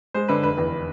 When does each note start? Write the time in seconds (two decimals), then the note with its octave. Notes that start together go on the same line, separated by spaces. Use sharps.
0.14 G#3 C5
0.28 D3 B4
0.43 F1 B4
0.58 E2